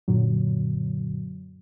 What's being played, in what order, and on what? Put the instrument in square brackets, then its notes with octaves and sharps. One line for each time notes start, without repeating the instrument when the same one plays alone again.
[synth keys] F#2 A#2 D3 F#3